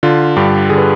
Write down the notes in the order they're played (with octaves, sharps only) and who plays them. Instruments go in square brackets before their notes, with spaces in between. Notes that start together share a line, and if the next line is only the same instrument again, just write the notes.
[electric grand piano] D3 F4
G2 G4
D3 G#4
B4